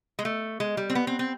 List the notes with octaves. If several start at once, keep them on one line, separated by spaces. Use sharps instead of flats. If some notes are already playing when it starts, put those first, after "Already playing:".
G#3
A3
G#3
G3
C4
B3
C4
C4